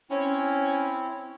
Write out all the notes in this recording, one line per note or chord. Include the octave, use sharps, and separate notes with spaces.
C4 C#4 E4